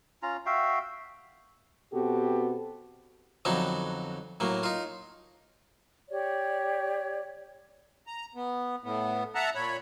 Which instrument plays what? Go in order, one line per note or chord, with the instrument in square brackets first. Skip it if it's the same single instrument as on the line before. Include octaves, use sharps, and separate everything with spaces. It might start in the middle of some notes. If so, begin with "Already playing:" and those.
[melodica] C#4 F4 A#5
F#4 E5 F5 G5
[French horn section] B2 B3 C4 F#4 G4 A4
[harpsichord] F2 D3 F#3 B3 D#4
A2 F#3 A#3
D#4 F4
[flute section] G4 C#5 D5
[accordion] A#5
B3
A2 B3
E5 F#5 A5 A#5
A#2 C#5 B5